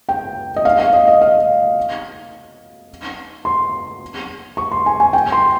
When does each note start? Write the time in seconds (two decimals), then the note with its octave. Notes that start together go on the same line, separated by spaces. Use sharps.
0.09 G5
0.56 D#5
0.65 F5
0.79 F5
0.93 D#5
1.08 D#5
1.22 F5
3.45 C6
4.57 C#6
4.72 C6
4.86 G#5
5.00 G#5
5.13 G5
5.32 C6